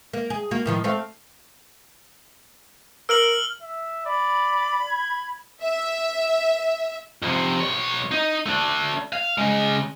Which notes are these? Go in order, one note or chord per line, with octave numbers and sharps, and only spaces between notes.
A#3
G#4
A#3 F#4
A2 D#3 F3
A3 C4 F5
A#4 E6 F6 F#7
E5
D5 B5
G#6
E5
F2 C3
B1 C#5
D#4
A3 D4
F5
C#3 G#3